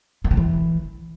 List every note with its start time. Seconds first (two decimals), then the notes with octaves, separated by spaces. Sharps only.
0.24 D#3
0.31 D3
0.37 E3